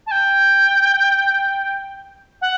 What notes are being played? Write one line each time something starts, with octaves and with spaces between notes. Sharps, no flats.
A5
G5
F#5